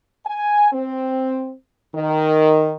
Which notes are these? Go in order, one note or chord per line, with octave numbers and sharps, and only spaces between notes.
G#5
C4
D#3